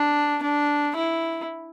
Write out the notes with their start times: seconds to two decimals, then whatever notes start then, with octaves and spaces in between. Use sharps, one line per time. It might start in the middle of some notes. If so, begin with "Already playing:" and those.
Already playing: D4
0.43 D4
0.96 E4